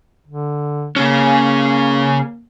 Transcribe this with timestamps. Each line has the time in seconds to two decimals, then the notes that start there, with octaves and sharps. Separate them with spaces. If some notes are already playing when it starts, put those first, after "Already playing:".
0.28 D3
0.96 C#3 A#3 C#4